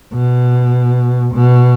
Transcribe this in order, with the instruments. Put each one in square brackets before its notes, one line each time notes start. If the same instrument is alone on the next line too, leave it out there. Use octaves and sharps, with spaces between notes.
[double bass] B2
B2